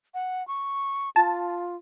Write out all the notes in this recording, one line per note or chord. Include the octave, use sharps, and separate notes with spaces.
F#5
C#6
F4 A5